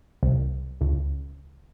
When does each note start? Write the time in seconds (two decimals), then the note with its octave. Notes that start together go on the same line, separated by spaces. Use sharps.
0.23 C2
0.81 C#2